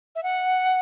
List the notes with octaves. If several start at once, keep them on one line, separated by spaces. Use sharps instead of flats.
E5
F#5